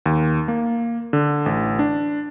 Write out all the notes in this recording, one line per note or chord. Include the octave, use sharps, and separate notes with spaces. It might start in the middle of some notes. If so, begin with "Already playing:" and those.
D#2
A#3
D3
A1
D4